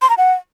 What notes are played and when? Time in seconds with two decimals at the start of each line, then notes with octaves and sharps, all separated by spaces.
0.02 C6
0.10 A#5
0.18 F#5